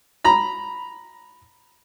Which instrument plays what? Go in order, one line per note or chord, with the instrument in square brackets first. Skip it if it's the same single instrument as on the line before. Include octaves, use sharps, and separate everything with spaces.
[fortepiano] A#5 B5